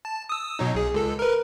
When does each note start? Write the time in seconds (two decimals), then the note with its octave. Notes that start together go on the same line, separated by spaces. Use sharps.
0.05 A5
0.29 D#6 E6
0.59 B2 F#3 D#4
0.74 B1 G#4
0.94 C#2 A4
1.19 A#4 B4